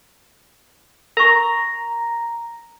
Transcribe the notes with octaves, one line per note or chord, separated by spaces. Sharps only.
A#4 A#5 C#6